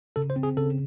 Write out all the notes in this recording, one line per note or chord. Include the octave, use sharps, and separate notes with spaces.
C#3 A4
C5
C4
G#4
C#3 A4